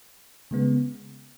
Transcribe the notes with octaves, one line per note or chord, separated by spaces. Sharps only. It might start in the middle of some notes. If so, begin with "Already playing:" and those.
C#3 G#3 B3